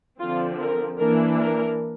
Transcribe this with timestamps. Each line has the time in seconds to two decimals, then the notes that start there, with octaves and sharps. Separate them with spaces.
0.20 D3 F3 C4 F4
0.61 A#4
0.99 E3 A#3 D4 A#4
1.38 A#4